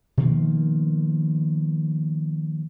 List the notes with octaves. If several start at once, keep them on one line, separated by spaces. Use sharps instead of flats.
B2 D#3 F3 A#3